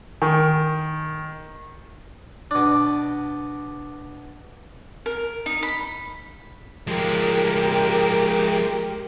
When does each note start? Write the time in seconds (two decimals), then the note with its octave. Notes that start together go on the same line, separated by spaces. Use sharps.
0.22 D#3
2.51 B2 D4
5.06 A#4
5.46 D#4
5.63 B5
6.87 F3 G#3 G4 A#4